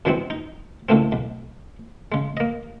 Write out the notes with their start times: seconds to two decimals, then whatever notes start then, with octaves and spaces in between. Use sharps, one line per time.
0.05 F#2 E3 F#3 G#3 B3 C4
0.30 D#4
0.89 C#2 A2 A3 A#3 C4
1.12 B1
2.12 C#3 G#3
2.37 A#3 D#5